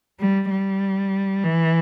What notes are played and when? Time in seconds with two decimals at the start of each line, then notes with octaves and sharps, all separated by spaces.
0.20 G3
0.50 G3
1.44 E3